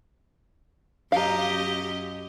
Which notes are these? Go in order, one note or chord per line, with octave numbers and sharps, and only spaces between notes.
F#2 G4 D#5 F5 A#5